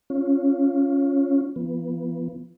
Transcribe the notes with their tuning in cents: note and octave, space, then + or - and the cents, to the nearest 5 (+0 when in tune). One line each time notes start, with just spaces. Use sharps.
C#4 +0 F4 +0
F3 -45 B3 +0